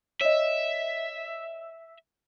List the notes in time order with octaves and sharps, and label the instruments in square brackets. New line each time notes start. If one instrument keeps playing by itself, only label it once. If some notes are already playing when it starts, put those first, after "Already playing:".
[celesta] C#5 D#5 [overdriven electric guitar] E5